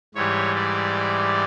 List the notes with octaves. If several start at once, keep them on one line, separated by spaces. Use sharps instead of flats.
G#2 E3 G3 C#5
D5